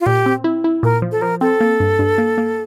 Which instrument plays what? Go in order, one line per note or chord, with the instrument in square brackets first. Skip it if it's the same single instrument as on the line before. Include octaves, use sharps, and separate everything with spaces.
[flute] F4
[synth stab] A#2 [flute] G4
[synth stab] C4
E4
E4
[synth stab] A#2 [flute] A#4
[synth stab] F3
[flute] A4
[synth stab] F3 [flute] A#4
[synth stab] C4 [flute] A4
[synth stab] A#3
G2
G2
A#3
A#3